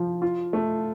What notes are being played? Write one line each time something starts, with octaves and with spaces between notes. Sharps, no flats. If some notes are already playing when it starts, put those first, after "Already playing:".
Already playing: F3
F4
A3